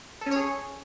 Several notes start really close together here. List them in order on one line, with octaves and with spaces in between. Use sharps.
A4 C#4 C#5 G#4